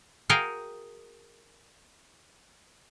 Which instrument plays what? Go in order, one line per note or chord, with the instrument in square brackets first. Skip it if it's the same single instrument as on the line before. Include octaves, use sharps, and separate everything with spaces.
[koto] F#4 G#4 A#4 F5 G5